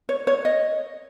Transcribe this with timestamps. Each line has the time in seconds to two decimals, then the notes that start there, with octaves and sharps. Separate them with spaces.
0.09 C#5
0.27 C#5
0.45 D#5